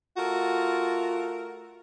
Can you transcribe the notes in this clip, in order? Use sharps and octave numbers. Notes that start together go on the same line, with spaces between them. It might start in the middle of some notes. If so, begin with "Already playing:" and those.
A3 F4 F#4 A#4